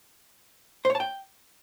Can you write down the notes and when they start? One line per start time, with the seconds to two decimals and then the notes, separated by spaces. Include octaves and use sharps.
0.85 C5
0.90 C#5
0.95 A5
1.00 G5